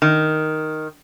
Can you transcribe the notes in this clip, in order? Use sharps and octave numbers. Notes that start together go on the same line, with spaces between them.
D#3